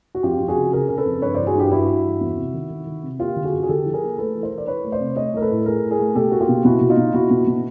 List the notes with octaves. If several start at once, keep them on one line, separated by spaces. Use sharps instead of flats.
F#4
F2 F4 G4
F2
F#4 G#4
C#3
C#3 G#4 A#4
C#3 A#4
A4 B4
F2
G2 B4 C#5
E3 C5 D5
F#4 G#4
G2 F4 G4
G2 E4 F#4
G2
E3
E2
C3
D#3
D#3
D#3
C3
A#3 F4 G4
D3
F#4 G#4
F#2
G#4
D3 G4 A4
F3
G#4 A#4
A#3
A3 A4 B4
E3
A#4 C5
E3
D5
E3 B4 C#5
A3
C5 D5
C3
A3 C#5 D#5
A3 A#4
A4 B4
A2
A3 G#4 A#4
A2
G#4 A#4
A3
B2 G4 A4
A#3 F#4
F4 G4
B2
B2 E4 F#4
B2
D#4 F4
B2
B2 E4 F#4
B2
B2